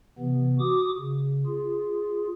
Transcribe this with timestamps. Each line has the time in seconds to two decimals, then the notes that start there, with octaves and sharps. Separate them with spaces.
0.18 C3 E3 B3
0.60 F#4 D6 D#6
0.98 C#3
1.46 F4 G#4